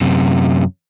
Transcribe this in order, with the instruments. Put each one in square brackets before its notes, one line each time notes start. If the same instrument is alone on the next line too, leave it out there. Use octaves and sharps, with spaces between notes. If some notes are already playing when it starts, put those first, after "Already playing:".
[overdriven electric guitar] F#2 C3